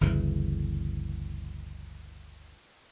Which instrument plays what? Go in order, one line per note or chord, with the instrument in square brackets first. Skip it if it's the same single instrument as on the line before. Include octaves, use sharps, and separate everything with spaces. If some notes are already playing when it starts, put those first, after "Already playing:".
[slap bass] G1 D2 C#3 E3